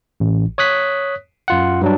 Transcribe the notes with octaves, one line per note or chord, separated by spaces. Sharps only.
A1
C#5 D#6 F#6 B6
F#2 F4 F#5
G2 F#3 D4